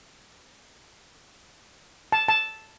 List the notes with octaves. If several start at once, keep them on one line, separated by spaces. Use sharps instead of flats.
A5
A5